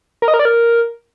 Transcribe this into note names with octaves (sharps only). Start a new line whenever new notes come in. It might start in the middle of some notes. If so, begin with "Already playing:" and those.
A#4
D#5
A#4
D5
A#4